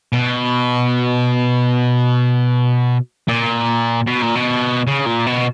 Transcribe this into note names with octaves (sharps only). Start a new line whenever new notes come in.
B2
A#2
B2
A#2
B2
C#3
A#2
B2